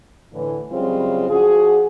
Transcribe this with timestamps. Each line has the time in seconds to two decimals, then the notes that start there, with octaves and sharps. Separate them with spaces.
0.33 A2 D3 E3
0.72 F#2 C#3 G3 G#3 C4 F4
1.30 F3 D4 F#4 G#4